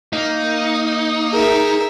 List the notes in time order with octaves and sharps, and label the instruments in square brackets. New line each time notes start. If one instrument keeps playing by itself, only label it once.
[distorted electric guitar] A#3 F5 [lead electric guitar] D#4
[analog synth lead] G#4 [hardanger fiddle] A#4 E5